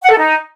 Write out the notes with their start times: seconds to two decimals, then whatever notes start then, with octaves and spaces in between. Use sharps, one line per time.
0.03 F#5
0.10 A4
0.18 D#4